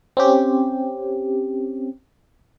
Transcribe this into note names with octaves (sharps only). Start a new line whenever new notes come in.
C4 C#4 G4